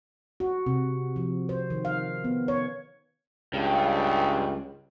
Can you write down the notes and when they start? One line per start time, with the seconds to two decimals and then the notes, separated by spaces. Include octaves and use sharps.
0.40 F#4
0.66 C3
1.16 F3
1.49 C5
1.70 D#3
1.85 F5
2.24 B3
2.48 C#5
3.53 C#2 G2